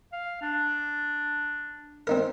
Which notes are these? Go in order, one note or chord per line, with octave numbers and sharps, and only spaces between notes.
F5
D4
C4 D#4 A#4